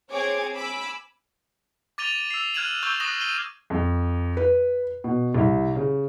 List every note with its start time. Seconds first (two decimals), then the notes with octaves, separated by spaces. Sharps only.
0.11 C4 G#4 C#5 D6 G#6
0.55 G#5 B5 D6 E6
1.98 D6 A6 D#7 F7 G7
2.30 E6 C7
2.54 F6 F#6 G#6 D#7 E7 F#7
2.83 C#6 E6 G6 G7
3.00 C#6 D#6 F#6 A#6 E7
3.20 D#7 E7 G7
3.70 F2
4.37 B4
5.04 B2
5.34 C2
5.75 C#3